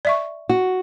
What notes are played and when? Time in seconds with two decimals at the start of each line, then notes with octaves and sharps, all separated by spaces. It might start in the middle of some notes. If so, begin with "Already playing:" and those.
0.05 D5 E5 C#6
0.49 F#4